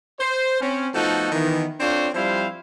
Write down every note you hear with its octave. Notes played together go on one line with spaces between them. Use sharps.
C5
C4 C#4
F3 A3 B3 D#4 F#4 A4
D#3 E3 B3
C4 D4 F4 A4 C5 C#5
F3 G3 C4 E4 C5 F5